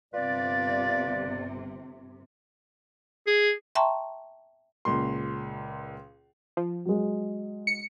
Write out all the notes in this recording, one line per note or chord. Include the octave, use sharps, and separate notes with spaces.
G1 C3 F4 B4 D5
G#4
E5 G5 A5 A#5 C6 C#6
C#2 A#2 C6
F3
F#3 G#3
C#7